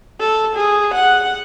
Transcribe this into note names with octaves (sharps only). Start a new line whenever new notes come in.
A4
G#4
F#5